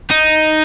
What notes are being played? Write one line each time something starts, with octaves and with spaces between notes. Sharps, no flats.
D#4